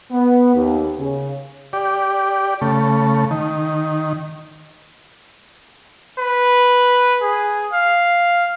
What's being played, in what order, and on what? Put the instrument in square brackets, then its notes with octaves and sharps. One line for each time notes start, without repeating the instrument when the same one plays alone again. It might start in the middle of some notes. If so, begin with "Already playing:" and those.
[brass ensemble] B3
D#2
C#3
[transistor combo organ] G4 D5
C#3 A3
D#3
[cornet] B4
G#4
F5